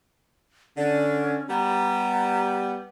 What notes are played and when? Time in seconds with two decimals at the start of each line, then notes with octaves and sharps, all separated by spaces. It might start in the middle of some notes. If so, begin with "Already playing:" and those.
0.77 D3 C#4
1.50 G3 B3 A#5